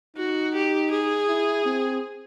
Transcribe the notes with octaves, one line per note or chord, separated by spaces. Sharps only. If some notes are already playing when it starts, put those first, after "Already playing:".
D#4 F#4
G4
G#4
E4
C4